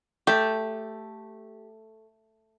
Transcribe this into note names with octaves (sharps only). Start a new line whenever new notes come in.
A3 G4